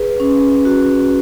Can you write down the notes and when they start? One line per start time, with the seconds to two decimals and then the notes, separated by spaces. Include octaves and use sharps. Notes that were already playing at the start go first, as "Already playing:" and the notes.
Already playing: G#4 B4
0.20 C#4
0.65 F#4